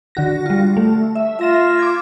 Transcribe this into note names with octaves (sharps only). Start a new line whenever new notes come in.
D3 F#4 A#6
G3 F4
A3
E5
F4 E5 A#6 E7
D6 G#6